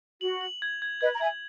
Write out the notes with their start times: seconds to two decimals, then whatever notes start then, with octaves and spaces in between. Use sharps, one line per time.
0.21 F#4 F#7
0.41 F#7
0.62 G#6
0.82 G#6
1.01 B4 D#5 G#6
1.15 A#5
1.21 E5 G#5 G#6